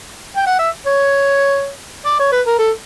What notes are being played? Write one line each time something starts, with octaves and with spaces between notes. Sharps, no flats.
G5
F#5
E5
C#5
D5
C#5
B4
A#4
A4